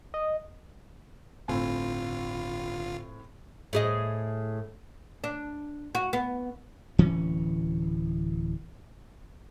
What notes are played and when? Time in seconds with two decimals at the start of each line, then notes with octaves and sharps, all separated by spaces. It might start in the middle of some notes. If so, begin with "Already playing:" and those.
0.14 D#5
1.48 G1 A2 C4 F4 G#5
3.73 A2 G#4 D#5
5.24 D4
5.95 F#4
6.13 B3
6.98 D1 E3 C#4